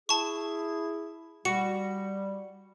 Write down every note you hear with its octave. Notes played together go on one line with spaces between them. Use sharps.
E4 G#4 A5 C#6
G3 F#4 C#7